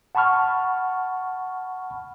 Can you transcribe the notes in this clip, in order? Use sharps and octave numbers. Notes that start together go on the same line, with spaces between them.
F#5 A5 B5 C#6 F6